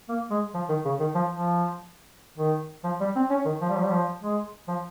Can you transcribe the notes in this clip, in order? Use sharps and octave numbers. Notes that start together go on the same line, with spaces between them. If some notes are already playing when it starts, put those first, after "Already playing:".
A#3
G#3
F3
D#3
C#3
D#3
F3
F3
D#3
F3
G3
C4
C#4
D#3
F3
G3
F3
G3
F3
G#3
F3